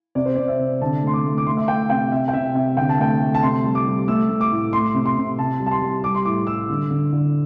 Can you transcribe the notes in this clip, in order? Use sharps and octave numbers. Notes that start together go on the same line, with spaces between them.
C3 D5
C5
C3 D5
E5
C3
D3 A5
A3 C6
D6
A3
D6
A3 C6
E5
A3 G5
C3 G5
C3 E5
G5
C3 E5
C3 E5
D3 G5
A5
A3 G5
A3
A5
C3 C6
G3
D6
G3
A3 E6
A3
D6
A2
A3 C6
C3
C6
C3
C3 A5
G3
A5
C6
G3
G3 D6
C6
A2 D6
G3 E6
D3
D3
D3